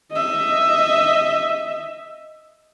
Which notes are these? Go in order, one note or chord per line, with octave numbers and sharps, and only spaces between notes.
D#5 E5